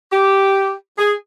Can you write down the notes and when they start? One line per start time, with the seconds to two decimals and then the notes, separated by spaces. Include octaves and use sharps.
0.12 G4
0.98 G#4